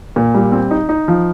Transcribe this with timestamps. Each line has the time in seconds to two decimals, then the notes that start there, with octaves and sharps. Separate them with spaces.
0.16 A#2
0.34 G3
0.52 C4
0.71 D#4
0.89 D#4
1.08 F3